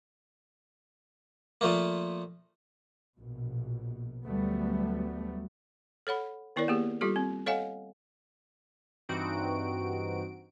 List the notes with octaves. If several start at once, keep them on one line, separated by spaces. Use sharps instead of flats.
A#2 F3 A3 A#3
A#1 B2
D2 F#3 G3 A3 B3
A4 C#5 F#5 B5
D#3 B3 E4 A#4 C#5 D5
A#3 B3 G4 G#4
G3 F4 G4 A4
C4
A4 C#5 D#5 F5 F#5 G#5
G2 E3 C4 D#4 F#4 D7